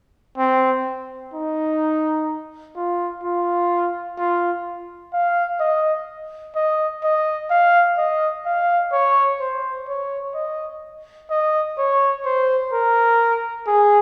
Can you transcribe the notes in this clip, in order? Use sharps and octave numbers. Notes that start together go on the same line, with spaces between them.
C4
D#4
F4
F4
F4
F5
D#5
D#5
D#5
F5
D#5
F5
C#5
C5
C#5
D#5
D#5
C#5
C5
A#4
G#4